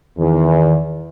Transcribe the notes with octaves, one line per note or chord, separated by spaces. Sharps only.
E2 D#3